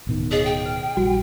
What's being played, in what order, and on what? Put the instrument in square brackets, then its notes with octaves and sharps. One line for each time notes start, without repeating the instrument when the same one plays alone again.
[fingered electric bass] D1 B2 D#3
[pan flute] G#4 [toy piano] C#5 D#5 F5
[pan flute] G5
[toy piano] B4
[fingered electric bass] A#1 G3 [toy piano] F#4